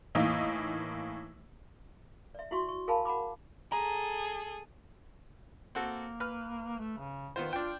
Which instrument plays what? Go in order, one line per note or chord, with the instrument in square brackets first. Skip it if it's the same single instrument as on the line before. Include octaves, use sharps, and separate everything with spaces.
[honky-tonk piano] A2 E3 A#3 D#4
[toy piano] D5 E5
E4 F#4 E5 C6 C#6
C#6
G#4 A#4 F5 G#5 A5 B5
F#5 A#5 B5 D6
[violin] G#4 A4 [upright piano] A#5
[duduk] A#3 [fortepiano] C4 F#4 A4
[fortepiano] B4 F6
[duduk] A3
C#3
[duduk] D#3 [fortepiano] B3 F4 C5
[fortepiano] D4 G5 [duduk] F4